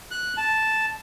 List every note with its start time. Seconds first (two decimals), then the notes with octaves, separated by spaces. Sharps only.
0.11 F#6
0.38 A5